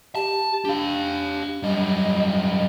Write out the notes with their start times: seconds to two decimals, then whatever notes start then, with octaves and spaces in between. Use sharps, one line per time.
0.15 G4 A5
0.65 D4 G4 F5
1.63 F#2 G3 D#5